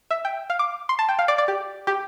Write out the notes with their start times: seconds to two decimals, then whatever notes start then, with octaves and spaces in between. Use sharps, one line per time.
0.11 E5
0.25 G5
0.50 F5
0.59 D6
0.89 C6
0.99 A5
1.09 G5
1.19 F5
1.28 D5
1.38 D5
1.48 G4
1.87 G4